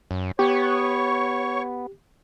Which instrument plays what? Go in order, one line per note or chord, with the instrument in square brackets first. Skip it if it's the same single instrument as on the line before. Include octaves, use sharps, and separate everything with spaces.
[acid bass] F#2
[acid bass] B3 [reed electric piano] G4 [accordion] C#5 C#6